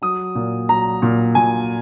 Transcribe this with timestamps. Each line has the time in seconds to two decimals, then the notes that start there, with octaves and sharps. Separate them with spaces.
0.02 F#3 D#6
0.35 A#2
0.69 F#3 A#5
1.02 A#2
1.35 A#2 G#5